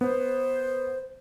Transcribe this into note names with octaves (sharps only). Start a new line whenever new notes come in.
B3 C5